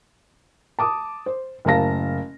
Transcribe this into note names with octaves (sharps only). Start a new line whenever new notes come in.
A5 D6 D#6
C5
F#1 A2 A#4 F5 A5 A#6